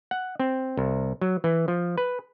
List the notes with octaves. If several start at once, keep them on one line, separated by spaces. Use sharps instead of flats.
F#5
C4
C2
F#3
E3
F3
B4